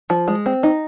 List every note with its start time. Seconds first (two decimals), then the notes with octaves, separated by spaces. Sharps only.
0.10 F3
0.28 G#3
0.46 C4
0.63 D#4